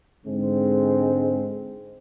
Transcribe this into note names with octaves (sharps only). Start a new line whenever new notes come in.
G#2 D3 G#3 C4